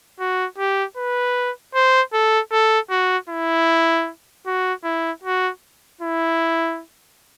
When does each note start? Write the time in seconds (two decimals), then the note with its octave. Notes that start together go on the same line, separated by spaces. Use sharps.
0.20 F#4
0.58 G4
0.97 B4
1.75 C5
2.13 A4
2.52 A4
2.90 F#4
3.29 E4
4.46 F#4
4.84 E4
5.23 F#4
6.01 E4